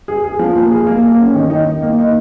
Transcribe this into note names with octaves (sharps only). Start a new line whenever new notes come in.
G#4
G#4
F3
A#3
G#4
A#3
A#3
C#4
D#3
D#4
D#4
A#3
D#4